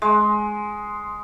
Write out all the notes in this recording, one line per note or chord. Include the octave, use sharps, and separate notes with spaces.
G#3